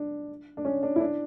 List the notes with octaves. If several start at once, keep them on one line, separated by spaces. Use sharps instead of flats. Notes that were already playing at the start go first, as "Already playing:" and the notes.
Already playing: D4
D4
C#4
D4
E4
D4